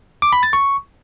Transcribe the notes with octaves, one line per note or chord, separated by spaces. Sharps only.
D6
B5
A6
C#6